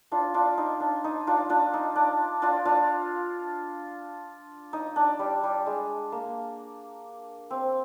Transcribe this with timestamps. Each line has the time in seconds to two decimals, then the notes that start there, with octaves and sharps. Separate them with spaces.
0.12 D4 F4
0.34 D4 F4
0.57 D#4
0.80 D4
1.04 D#4
1.27 D4 F4
1.49 D4 F4
1.74 D#4
1.96 D4
2.42 D4 F4
2.65 D4 F4
4.73 D#4
4.96 D4
5.19 G3
5.43 G3
5.66 G#3
6.12 A#3
7.50 C4